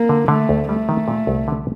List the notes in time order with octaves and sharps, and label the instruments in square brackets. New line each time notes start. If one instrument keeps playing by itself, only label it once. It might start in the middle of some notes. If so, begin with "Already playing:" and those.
Already playing: [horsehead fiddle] A#3
[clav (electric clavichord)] D3
[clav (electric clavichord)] D3 [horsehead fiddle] A3
[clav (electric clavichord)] D2
[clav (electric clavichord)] G3 [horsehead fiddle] A3
[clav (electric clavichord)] D#3
A#2
C2
D3